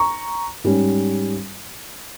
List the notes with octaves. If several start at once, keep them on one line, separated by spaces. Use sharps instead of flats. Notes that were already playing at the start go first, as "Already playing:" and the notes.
Already playing: A#5 C#6
G#2 G3 C#4